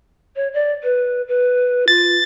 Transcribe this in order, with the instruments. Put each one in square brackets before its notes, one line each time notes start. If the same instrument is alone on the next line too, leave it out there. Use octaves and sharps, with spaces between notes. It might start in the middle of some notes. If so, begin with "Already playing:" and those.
[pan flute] C#5
D5
B4
B4
[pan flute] F4 [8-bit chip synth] A6